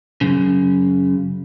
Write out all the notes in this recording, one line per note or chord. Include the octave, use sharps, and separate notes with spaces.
F#2 C#3